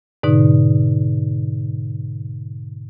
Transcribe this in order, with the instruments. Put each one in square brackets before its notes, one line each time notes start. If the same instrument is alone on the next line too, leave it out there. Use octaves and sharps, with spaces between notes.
[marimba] G#2 B2 D3 D#4